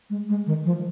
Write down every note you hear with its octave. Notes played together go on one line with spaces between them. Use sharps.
G#3
G#3
D#3
F3